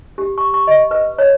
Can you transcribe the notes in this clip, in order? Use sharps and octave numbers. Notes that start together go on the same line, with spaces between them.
G4
C#6
C#6
D#5
B4
C#5